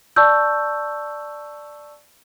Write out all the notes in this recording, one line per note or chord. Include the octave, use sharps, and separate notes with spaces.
D5 A5 C#6 E6 G6